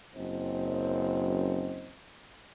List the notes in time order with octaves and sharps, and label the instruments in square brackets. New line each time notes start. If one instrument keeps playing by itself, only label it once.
[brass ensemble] F#1 F#2 C4 D#5